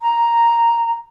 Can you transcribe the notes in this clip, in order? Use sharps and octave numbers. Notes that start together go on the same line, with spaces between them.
A#5